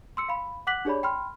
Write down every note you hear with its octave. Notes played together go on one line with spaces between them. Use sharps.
C6 E6 C#7
F5 B5
F#5 D6 F#6 B6 F#7
D4 G4 G#4 C#5 D5 B5
G5 B5 C6 F6